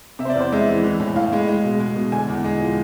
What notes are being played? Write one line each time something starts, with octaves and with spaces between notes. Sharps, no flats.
C3 E5
C5
D5
E2
C5
G#3 E5
E3
E3
A2
A2 F5
G#3
G#3
B2
G#3
B2
D3 G#5
E2
G#3
F3